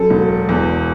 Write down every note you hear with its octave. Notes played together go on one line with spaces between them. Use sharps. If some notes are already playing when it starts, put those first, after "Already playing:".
Already playing: F#2 A4
E1
E2